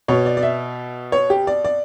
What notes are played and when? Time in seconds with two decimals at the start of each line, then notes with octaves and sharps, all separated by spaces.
0.08 B2 C#5
0.26 D5
0.37 D5
0.42 E5
1.12 C#5
1.30 G4
1.47 D5
1.65 D5